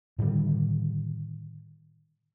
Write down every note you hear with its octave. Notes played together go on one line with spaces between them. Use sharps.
A2 D3 D#3 G3